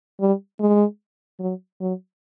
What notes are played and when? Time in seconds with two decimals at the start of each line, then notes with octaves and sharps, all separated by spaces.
0.20 G3
0.60 G#3
1.40 F#3
1.80 F#3